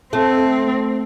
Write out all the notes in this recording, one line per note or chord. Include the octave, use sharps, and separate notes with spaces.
A3 C4